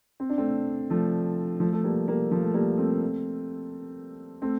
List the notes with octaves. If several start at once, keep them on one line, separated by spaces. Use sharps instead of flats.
C4
D4
A3 C4
F3 A3
F3 A3
A3
G3 A#3
G3 A#3
F3 A3
A3
G3 A#3
A3 C4
A3 C4